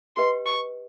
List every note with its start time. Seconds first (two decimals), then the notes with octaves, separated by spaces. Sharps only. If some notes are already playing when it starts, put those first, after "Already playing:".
0.16 G4 B4 D#5 G5 C6
0.46 C#6